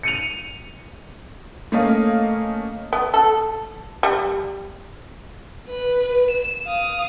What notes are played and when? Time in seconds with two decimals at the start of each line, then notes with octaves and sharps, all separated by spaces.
0.03 C#7 D#7 F7
1.72 A3 A#3 C#4 D#5 F5
2.93 B3
3.14 A4
4.03 G3
5.68 B4
6.31 E7
6.66 F5 D#6